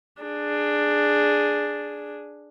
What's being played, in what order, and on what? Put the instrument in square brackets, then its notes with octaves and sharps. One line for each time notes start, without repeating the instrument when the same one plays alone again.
[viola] D4 G#4